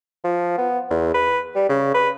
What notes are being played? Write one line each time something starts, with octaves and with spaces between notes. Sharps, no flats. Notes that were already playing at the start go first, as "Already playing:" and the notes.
F3
B3
E2
B4
G3
C#3
B4